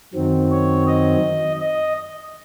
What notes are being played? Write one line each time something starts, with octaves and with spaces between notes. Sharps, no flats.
F#2 D#3 F#3 C4
C#5
D#5
D#5